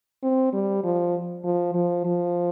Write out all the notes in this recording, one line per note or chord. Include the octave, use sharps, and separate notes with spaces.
C4
G3
F3
F3
F3
F3